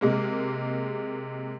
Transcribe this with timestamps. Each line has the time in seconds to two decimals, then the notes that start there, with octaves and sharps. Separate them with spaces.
0.01 C3 G#3 A#3